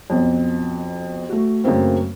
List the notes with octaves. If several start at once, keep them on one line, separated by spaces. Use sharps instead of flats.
B1 F2
A3 F#4
F#2 C#3 A3 A#3 C4